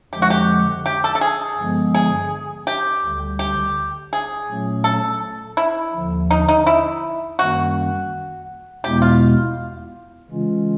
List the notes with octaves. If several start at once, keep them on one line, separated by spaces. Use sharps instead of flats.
F2 D3 F3 G#3 G4
F#4
G4
G4
A4
A4
G#4
G2 D3 F3 G#3 B3
G#4
G4
D2 D3 G3
G4
G#4
A#2 F#3 A3 C#4
A4
E4
D#2 D3 F3
D#4
D#4
E4
F#2 D#3 G3 A#3 C#4 F#4
E2 B2 G#3 B3 E4 G4
F4
C#3 E3 G#3 C#4 F4